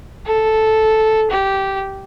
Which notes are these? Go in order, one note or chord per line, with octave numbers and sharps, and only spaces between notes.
A4
G4